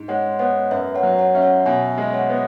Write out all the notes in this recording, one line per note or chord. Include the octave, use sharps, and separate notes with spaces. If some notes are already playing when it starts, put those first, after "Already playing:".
Already playing: G#2
G#3 C#5 F#5
B3 C#5 F#5
F#2 B4 E5
C#5 F#5
F#3
C#5 F#5
C#4 E5
C#5 F#5
B2 E5 G#5
G#3
E5
C#5 F#5
B3